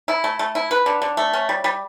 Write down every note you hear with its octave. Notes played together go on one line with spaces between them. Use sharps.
E4
A3
A3
E4
B4
D3
D3
A3
C#4
G3
G3